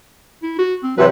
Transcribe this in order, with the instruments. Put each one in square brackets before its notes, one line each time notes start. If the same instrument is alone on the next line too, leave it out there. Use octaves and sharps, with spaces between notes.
[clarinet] E4
F#4
C4
[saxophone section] C3 E3 F#3 [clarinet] B4